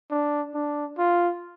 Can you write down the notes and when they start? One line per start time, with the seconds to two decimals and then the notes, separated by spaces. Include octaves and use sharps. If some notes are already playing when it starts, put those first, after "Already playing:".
0.11 D4
0.54 D4
0.98 F4